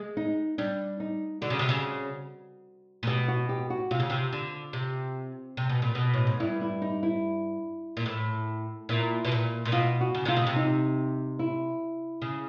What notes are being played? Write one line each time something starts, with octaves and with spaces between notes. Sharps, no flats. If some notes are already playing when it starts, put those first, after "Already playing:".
Already playing: G#3
D#4
G3 D4
D#4
D3 F#4
C#3
C3
C#3
A#2
B2 G4
F#4
G4
F#4
C3 F4
C#3
C3
D3
C3
C3
B2
A#2
B2
A2
G#2
G2 E4
E4
D#4
E4
A#2
A2
A#2 E4
B2
A#2
A#2
B2 F4
F#4
C#3
C3 F4
B2
C3
D#4
E4
C#3